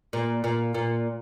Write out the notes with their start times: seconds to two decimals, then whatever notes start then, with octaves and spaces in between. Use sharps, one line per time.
0.13 A#2
0.44 A#2
0.74 A#2